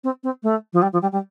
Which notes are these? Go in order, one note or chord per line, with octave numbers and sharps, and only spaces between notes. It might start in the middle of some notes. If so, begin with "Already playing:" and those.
C4
C4
A3
F3
G3
F3
G3
G3